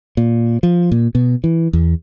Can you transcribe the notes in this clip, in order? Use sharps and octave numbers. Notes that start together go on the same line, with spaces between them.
A#2
F3
A#2
B2
E3
E2